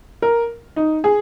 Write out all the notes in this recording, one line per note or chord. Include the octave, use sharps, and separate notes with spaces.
A#4
D#4
G#4